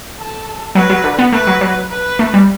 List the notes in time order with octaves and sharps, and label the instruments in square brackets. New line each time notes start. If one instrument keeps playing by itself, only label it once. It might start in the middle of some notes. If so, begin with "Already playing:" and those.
[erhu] A4
[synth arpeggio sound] F#3 [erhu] B4
[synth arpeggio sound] F#3
D3
B3
[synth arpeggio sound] A3 [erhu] B4
[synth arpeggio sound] F#3
F#3
[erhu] B4
[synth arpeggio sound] A3
G3